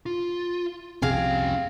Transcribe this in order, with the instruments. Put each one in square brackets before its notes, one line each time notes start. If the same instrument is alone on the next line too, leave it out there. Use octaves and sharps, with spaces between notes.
[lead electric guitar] F4
[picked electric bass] C2 F2 C3 [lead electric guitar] C#4 G5 [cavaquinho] G#4 F5